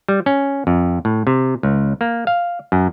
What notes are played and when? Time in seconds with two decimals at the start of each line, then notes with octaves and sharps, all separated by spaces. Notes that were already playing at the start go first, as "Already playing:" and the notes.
0.09 G3
0.26 C#4
0.67 F2
1.05 A2
1.27 C3
1.63 C#2
2.01 A#3
2.27 F5
2.72 F#2